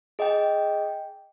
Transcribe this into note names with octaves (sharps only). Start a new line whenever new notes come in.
G#4 D#5 G5